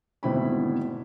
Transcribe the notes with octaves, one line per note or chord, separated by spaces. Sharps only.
G#1 D2 B2 E4 G5 B5